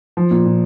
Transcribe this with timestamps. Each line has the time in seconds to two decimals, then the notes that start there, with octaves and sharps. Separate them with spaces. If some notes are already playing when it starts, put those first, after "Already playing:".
0.17 F3
0.31 A#2
0.46 A#2